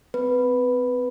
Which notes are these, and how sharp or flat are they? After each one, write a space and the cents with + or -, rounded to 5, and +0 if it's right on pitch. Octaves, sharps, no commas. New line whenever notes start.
C4 -30 B4 +0